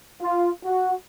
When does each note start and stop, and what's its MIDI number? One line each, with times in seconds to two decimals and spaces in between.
0.22 0.50 65
0.65 0.93 66